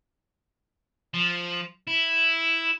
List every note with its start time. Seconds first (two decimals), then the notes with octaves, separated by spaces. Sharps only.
1.14 F3
1.87 E4